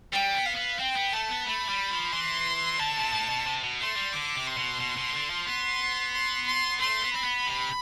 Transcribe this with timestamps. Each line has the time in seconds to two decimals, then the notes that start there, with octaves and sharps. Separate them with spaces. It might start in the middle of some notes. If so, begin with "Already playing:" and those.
0.12 G3 G5
0.35 B3
0.46 F5
0.57 B3
0.79 C4 G5
0.96 B3
1.12 A3 A5
1.29 B3
1.46 A3 B5
1.69 G3
1.91 F3
2.12 E3 C6
2.80 D3 A5
2.97 C3
3.13 A2
3.29 B2
3.46 C3
3.63 B2
3.80 A3 C6
3.96 G3
4.13 D3 D6
4.36 C3
4.47 C6
4.57 B2
4.80 B2
4.97 B2
5.13 D3
5.30 F3
5.46 B3 C6
6.13 C6
6.47 C6
6.80 A3 C6
7.02 B3
7.13 C4 B5
7.25 B3
7.47 C3